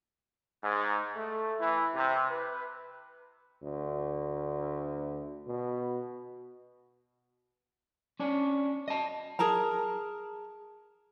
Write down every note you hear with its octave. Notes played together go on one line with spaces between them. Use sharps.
G#2
A3
E3
C3
B4
D2
B2
C#4 D4 C#5
D#5 A5
G#4 A#4 A5 A#5